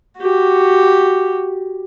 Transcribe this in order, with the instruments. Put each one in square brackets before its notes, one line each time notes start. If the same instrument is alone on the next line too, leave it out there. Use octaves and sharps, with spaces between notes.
[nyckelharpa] F#4 G4